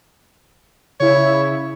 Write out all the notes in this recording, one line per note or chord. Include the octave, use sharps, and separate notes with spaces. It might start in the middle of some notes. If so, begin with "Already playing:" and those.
C#3 E4 C#5